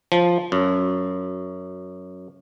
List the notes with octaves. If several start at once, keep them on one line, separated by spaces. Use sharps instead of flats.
F3
F#2